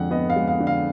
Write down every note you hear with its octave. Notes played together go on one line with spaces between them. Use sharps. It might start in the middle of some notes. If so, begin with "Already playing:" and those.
Already playing: F2 D3 G#3 F#5
B3 D#5
F5
G#3
F5
D3
F5